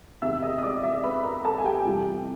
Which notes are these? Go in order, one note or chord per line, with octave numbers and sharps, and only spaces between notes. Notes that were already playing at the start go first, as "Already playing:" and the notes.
E2 C3 D#3 E5 E6
D#5 D#6
D#6
D5 D6
E5 E6
B4 B5
A#4 A#5
A4 A5
G#5
G4 G5
F2 C3 E3 G3